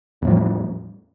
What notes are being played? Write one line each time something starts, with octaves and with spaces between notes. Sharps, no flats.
E2 A2 F3 G3